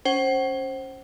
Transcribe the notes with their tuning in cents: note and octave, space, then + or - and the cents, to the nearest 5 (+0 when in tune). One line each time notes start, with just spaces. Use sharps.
C#4 +0 C5 +20 F#5 +40